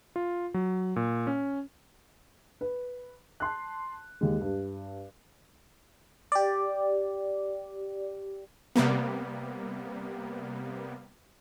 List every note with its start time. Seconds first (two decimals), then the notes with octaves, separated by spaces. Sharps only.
0.16 F4
0.54 F#3
0.96 A#2
1.27 C#4
2.61 B4
3.40 A5 C6 F#6
4.21 D#2 G#3
4.41 G2
6.32 G4 D5
8.76 C3 G3 A#3 B3